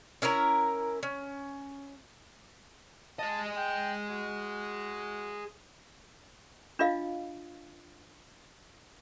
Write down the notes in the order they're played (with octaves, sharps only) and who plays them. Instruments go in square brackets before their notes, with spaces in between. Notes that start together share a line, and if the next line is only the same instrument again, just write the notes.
[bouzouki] C#4 E4 A#4 A#5
C#4
[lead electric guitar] G#4 D#5 [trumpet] A5
[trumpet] G5
F#4
[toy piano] D4 F4 D#5 F5